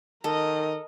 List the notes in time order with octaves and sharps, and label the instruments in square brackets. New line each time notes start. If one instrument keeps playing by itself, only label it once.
[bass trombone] D#3 [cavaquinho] A4 [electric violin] A#4 D#5